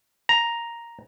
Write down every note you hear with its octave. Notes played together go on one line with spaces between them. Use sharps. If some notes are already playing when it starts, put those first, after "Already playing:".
A#5